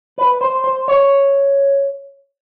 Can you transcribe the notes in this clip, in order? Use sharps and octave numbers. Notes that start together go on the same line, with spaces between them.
B4
C5
C5
C#5